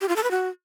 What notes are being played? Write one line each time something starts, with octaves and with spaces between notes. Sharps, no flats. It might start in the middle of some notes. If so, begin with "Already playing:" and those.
G4
F4
A4
B4
F#4